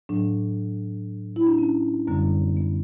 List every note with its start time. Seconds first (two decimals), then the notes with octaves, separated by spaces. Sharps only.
0.09 A2 F#3 D4
1.36 E4
1.47 D4
1.58 C#4
2.07 F#2 D3 G3 B3
2.57 B3